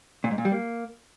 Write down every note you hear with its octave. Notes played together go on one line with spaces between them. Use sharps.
A#2
G#2
A#2
G3
A#3